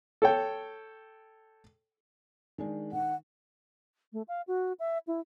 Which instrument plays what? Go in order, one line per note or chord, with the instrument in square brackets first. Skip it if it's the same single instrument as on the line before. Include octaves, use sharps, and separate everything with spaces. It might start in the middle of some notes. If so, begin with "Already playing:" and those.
[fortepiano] A4 C#5 G5
[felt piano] D#3 G#3 D4
[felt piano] D#3 [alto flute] F#5
[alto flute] A3
F5
F#4
E5
E4